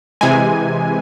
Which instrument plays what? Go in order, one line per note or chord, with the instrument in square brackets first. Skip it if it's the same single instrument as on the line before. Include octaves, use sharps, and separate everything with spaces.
[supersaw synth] C3 E3 G#3 G#5